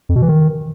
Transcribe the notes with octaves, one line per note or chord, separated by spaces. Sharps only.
F2
B2
E3
D#3